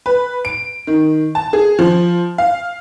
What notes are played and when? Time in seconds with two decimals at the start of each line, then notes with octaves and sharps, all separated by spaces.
0.06 B4
0.45 D7
0.87 D#3
1.35 A5
1.53 G#4
1.79 F3
2.38 F5